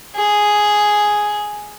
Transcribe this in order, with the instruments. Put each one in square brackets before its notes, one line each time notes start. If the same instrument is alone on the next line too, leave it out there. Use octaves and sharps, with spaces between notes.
[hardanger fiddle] G#4